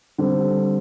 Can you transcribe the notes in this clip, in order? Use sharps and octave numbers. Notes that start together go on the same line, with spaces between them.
D3 G3 C4